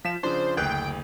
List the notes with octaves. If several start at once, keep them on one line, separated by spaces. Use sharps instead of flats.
F3 B6 E7
C#3 F3 D4 C5
F#1 D2 G5 F#6